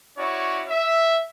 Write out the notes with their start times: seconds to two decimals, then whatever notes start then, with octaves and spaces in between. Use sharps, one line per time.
0.18 C#4 E4 F#4 C#5 D5
0.69 E5